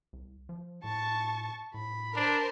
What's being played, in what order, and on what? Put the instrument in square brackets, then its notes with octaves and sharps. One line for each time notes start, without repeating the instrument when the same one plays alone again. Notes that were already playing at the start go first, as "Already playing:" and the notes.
[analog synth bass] C2
F3
[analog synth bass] A2 [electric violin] A5 C#6
[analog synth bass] A2 [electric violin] B5
[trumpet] D4 [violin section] A#4 C5 A5